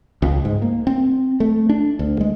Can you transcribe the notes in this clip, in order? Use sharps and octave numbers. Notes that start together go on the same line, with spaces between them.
C#2
G#2
A#3
C4
A3
D4
D2
G#3